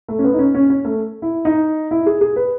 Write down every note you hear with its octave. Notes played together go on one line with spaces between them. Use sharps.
A3
C#4
B3
D#4
C#4
C#4
C#4
A3
E4
D#4
E4
G#4
G#4
B4